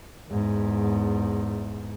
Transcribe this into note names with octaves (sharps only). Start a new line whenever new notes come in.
E2 G#2